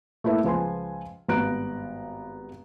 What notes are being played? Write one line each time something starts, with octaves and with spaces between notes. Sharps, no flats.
A3 A#3 E4 B4 E5
C#2 F3 B4 G#5 C6
G#1 G2 B3 A#5 F#6 D7